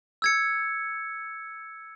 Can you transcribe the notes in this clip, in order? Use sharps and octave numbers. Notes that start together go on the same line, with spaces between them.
E6 G#6 C#7